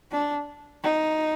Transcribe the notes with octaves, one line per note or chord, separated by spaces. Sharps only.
D4
D#4